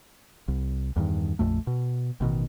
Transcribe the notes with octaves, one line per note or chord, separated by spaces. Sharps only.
C2
E2 G2 D#3
A#1 F2 A3
B2
A1 B2 D#3